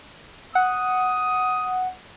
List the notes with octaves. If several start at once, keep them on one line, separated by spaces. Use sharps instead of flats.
F#5 D#6